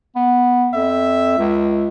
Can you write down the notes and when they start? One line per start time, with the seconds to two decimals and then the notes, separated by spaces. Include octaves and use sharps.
0.16 B3
0.74 F2 E5
1.38 C#2